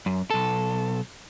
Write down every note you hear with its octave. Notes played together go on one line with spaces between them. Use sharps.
F#2
B1 A4